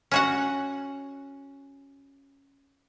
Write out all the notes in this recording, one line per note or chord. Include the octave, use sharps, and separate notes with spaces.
C#4 F#4 F#5